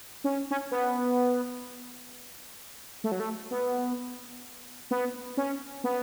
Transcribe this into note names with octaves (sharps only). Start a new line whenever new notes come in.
C#4
C#4
B3
A3
F#3
A3
B3
B3
C#4
B3